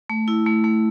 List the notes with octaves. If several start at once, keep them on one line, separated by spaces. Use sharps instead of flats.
A3
E4
A3
A3